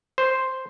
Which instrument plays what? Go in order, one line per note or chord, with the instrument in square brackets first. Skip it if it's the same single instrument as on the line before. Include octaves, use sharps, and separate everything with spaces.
[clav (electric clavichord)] C5